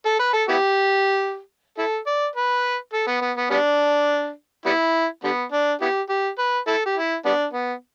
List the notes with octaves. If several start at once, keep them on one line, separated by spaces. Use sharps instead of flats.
A4
B4
A4
B3 E4 G4
E4 A4
D5
B4
A4
B3
B3
B3
G3 B3 D4
G3 B3 E4
D3 G3 B3
D4
B3 E4 G4
G4
B4
E4 A4
G4
E4
G3 B3 D4
B3